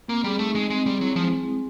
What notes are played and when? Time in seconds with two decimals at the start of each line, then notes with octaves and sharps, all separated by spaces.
0.08 A#3 C4
0.24 G3 G#4
0.39 A3 D#4
0.55 G3 G#3
0.70 G#3 C4
0.86 G3 G#4
1.00 F#3 E4
1.16 F3 G#3